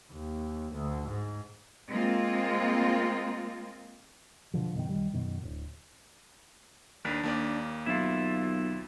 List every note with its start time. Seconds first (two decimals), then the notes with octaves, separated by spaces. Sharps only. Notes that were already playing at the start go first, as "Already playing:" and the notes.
0.12 D#2
0.73 D2
1.08 G#2
1.90 G#3 A#3 C4 F4
4.54 B2 D3 F3
4.75 F#2 B2 D#3
4.89 B1 D#3 G3
5.13 F#2 B2 D#3
5.43 D1
7.05 D#2 D4 A#4 B4
7.23 D#2 A#3 D5
7.86 B1 E4 F4